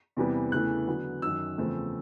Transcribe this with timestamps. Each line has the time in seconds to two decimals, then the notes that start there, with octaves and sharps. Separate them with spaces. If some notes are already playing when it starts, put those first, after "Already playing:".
0.17 E2 C3 E3 G3 B3
0.52 E2 C#3 E3 A3 F#6
0.87 D3 F#3 B3
1.22 F#2 D#3 F#3 E6
1.58 E2 C#3 F3 A3 C4